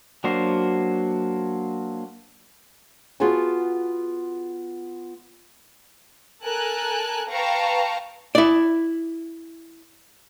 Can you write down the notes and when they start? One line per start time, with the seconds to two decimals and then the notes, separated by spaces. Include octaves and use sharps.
0.24 F#3 A#3 D4 F#4 C5
3.20 B3 F4 F#4 G#4 F#5 A5
6.44 A4 A#4 G#5 A5 F#6
7.30 B4 F5 G5 A5 A#5 C#6
8.35 E4 D5